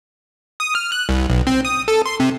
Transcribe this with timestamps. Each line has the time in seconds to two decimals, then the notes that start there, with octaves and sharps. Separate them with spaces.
0.60 D#6
0.75 F6
0.92 F#6
1.09 C2
1.30 B1
1.47 C4
1.65 D#6
1.88 A4
2.06 C6
2.20 C3